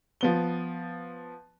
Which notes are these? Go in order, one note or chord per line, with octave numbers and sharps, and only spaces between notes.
F3 B3 G7